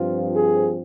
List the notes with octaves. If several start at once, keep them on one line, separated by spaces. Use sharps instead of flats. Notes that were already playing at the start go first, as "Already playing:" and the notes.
Already playing: G2 F3 C4 F4
G#4